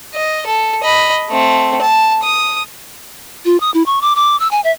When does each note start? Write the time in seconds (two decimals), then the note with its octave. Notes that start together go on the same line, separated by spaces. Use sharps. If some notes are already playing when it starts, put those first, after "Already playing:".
0.14 D#5
0.46 A4
0.83 D#5 B5
1.29 A3 C4
1.81 A5
2.23 D#6
3.45 F4
3.61 D#6
3.74 E4
3.86 C#6
4.02 D6
4.16 D6
4.40 E6
4.51 G#5
4.64 E5